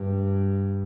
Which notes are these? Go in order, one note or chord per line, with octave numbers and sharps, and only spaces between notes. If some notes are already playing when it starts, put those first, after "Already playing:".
Already playing: G2